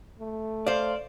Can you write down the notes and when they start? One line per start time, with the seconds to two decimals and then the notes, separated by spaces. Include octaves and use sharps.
0.19 A3
0.67 C5 D5 F5